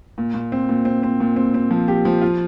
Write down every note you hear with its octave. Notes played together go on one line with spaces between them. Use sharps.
A#2
A#2
C4
A#2
C4
C4
A#2
C4
C4
F3
G4
F3
F4